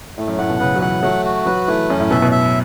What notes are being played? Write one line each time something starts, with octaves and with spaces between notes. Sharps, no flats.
A2 A3
F#2
A2 F#5
B2
C#3 B4
F#3
E3 F#5
F#3 A3
F#4
F#3 B4
E3 A3
F#2 C#4
A2
B2 E5
B2
E5